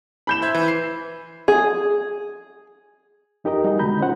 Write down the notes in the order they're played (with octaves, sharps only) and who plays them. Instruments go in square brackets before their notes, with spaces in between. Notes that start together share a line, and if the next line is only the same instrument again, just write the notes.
[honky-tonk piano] B5 G6 E7
[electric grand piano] C5 E5 G#6
E3
C7
[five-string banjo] G#4
[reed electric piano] F2 D#4 G4 A#4 D#5 A#5
G3 D#4 F#4 G#4 D#5
B2 D3 G#3 A#5 B5 G6
C#4 D#4 F4 C5 F#5